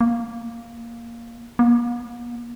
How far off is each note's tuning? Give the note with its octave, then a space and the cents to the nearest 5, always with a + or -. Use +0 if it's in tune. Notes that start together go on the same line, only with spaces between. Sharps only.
A#3 +0
A#3 +45